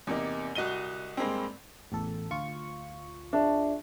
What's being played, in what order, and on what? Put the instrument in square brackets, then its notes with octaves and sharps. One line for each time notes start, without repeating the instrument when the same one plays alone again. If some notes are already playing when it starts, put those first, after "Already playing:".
[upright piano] E2 C3 A#3 D#4
C2 F#4 D#5 D#7 G7
G2 G#3 A#3 C4
[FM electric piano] A1 E2 A4
D2 F4 C#6
[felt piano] D4 [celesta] G#4 E5 A5